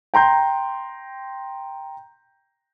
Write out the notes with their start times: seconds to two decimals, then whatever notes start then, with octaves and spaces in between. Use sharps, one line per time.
0.14 G5 A#5 C6 G6